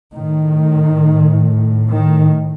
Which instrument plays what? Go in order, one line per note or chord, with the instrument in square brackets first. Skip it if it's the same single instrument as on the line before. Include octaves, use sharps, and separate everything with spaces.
[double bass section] A2 D#3
D#3